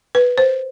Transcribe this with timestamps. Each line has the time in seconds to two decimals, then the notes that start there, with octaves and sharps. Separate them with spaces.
0.15 B4
0.38 C5